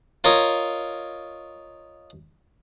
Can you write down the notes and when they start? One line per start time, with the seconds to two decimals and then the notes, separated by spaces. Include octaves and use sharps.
0.24 F4 A#4 C#5 D#5